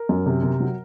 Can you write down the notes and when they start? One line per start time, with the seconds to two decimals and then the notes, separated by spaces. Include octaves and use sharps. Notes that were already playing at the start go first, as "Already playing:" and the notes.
Already playing: A#4
0.09 F#2
0.26 C3
0.43 C3
0.60 F#3